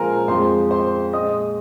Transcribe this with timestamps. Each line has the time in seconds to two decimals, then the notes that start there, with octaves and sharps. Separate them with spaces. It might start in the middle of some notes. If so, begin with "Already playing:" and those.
Already playing: A#2 F3 G#3 A#4 C5 F5 G#5 A#5
0.28 F2 F3 G#3 C5 C6
0.71 C5 C6
1.13 A#2 G#3 D#5 D#6